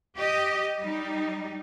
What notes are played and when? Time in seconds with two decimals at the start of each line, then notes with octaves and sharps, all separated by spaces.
0.18 G4 D#5
0.80 G3 D#4